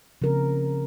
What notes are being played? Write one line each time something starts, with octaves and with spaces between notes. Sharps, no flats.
C#3 F3 C4 A#4